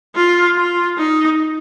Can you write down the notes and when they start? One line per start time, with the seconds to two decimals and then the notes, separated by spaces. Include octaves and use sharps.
0.16 F4
0.57 F4
0.98 D#4